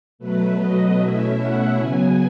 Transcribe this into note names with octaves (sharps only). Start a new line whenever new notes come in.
B2 F#3 A3 B4
D#5
B2 A3 C#4 E4 E5
F#5
C#3 F#3 B3 G#5